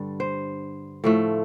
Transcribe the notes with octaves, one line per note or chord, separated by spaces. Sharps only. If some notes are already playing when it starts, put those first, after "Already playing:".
Already playing: G2 D3 G3
C5
A2 F3 A3